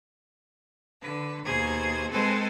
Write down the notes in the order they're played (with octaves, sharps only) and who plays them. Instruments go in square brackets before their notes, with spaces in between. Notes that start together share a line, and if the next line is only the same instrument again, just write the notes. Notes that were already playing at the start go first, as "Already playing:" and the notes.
[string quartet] D3 B4
D#2 B2 G#4 C5 G#6
G#3 C4 A4 B4 C5 G#5